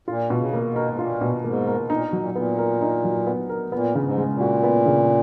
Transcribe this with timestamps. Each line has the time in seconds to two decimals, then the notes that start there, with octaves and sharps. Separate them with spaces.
0.08 A#2 F4
0.30 B2
0.38 C#3
0.53 A#3
0.68 B2
0.76 A#4
0.90 G#2
0.99 A#2 F4
1.21 B2
1.44 G#2 A#3
1.67 A#4
1.90 A#2 D#4
2.04 B2
2.13 A#2 F#3
2.35 A#2 B3
2.58 A#4
2.81 D#4
3.04 F#3
3.26 B3
3.50 A#4
3.72 A#2 B3
3.95 C#3
4.02 G#2
4.18 G#3
4.33 A#2
4.41 F#4
4.63 B3
4.86 C#3